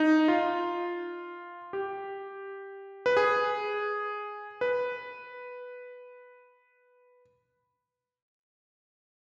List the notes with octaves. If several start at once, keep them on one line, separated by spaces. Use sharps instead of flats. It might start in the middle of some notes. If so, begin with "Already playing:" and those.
Already playing: D#4
F4
G4
B4
G#4
B4